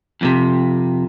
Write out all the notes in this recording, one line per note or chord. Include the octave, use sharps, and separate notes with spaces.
F2 A2 C3